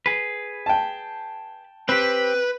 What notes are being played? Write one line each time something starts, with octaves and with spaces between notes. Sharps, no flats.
G#4 B4
G5 A5
C4 G4 B4